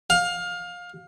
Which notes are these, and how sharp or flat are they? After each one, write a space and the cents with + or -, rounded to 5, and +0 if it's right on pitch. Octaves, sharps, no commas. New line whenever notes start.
F5 +20